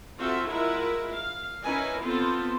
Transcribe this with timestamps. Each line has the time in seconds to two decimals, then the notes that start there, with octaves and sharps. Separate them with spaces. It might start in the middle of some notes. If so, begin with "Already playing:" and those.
0.19 C4 F4 F#4 A4 C5 E5
0.49 G#3 E4 F4 A#4 E5 F#5
1.10 F5
1.63 C#4 D#4 E4 A#4 B4 G#5
2.01 B3 C4 F4 A4 B4 C5